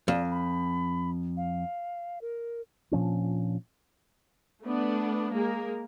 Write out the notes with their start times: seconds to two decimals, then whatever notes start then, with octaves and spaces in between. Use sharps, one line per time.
0.08 F2 D5
0.31 B5
1.37 F5
2.22 A#4
2.91 A#2 F3 C#4 D4
4.63 A3 B3 D4
5.33 G#3 A#3 G#4 A#4